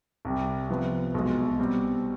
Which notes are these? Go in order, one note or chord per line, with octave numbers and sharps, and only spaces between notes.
C2 C3 G3
C3 F3 B3
B1 B2 G#3
B2 G3 C4